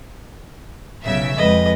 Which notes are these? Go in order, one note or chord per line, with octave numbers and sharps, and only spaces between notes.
B1 C#3 E5
F2 G#3 B4 D#5